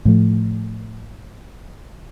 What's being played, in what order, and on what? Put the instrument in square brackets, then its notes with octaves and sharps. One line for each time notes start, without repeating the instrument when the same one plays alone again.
[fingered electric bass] A2 F3 A3